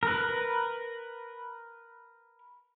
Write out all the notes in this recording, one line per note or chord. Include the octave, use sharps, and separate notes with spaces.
A#4 B4